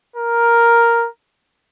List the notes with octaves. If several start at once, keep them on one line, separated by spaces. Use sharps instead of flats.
A#4